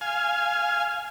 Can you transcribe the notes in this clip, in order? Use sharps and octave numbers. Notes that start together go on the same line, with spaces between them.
F5 G#5